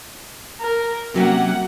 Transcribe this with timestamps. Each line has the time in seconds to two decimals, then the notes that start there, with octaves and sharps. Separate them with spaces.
0.61 A#4
1.14 C3 F#3 A#3 C#4 F#5